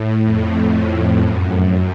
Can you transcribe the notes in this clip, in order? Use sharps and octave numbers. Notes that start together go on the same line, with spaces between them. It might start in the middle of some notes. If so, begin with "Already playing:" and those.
Already playing: A2
F2
F#2